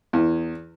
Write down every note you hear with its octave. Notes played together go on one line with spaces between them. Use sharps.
E2